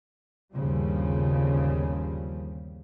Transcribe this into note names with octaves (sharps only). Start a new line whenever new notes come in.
G1 D#2 C#3 F3 G3